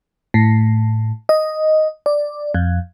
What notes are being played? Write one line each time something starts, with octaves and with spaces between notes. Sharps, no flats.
A2
D#5
D5
F2